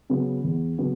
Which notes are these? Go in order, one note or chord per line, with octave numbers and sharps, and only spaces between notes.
C#3 F#3 B3
E2
C#3 F#3 B3